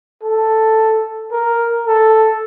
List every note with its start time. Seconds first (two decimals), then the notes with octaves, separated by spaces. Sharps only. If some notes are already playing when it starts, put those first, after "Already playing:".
0.23 A4
1.32 A#4
1.86 A4